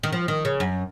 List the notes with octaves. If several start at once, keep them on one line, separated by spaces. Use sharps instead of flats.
D#3
F3
D#3
C#3
F#2